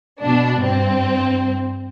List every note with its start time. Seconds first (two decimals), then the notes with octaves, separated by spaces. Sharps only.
0.21 B2 D4
0.61 G2 C4